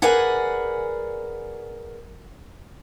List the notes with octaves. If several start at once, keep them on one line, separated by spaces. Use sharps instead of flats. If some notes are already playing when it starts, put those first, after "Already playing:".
G#4 A#4 B4 D5 F#5 G#5